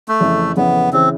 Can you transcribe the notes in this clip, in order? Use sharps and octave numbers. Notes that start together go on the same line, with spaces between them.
A3
F2 C#3 E3
F2 C#3 E3 B3
C#3 E3 C4